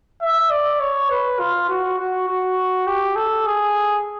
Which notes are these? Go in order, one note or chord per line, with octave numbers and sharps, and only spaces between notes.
E5
D5
C#5
B4
F4
F#4
F#4
F#4
G4
A4
G#4